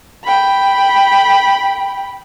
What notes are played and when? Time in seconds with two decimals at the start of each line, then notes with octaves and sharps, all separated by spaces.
0.24 G5 B5